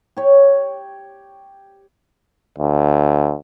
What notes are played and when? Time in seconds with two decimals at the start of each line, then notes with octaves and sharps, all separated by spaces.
0.17 G4 C#5
2.59 D2